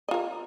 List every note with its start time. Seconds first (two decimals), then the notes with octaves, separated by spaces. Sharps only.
0.08 D#5
0.11 F4
0.14 A#4